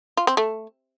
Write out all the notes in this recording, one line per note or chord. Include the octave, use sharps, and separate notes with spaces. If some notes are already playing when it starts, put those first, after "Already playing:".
F4
C4
A3